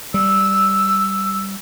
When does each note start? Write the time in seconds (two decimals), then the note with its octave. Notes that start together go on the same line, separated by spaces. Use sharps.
0.14 G3 E6